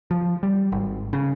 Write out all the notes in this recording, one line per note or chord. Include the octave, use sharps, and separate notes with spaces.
F3
G3
G#1
C#3